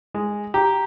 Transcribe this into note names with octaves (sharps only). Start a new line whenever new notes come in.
G#3
G4 A#5